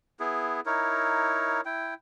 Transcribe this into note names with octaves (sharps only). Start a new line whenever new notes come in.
B3 E4 G#4
D#4 E4 A#4 C#5
E4 G5